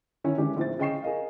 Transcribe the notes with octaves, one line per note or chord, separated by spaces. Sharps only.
D#3 C#4 E4 C#5
D#3 E3 G#3 C#4 D4 G4
A#1 A2 C4 A6
C#3 D#5 G5 C#6 C7 E7
G#4 A#4 D#5 F5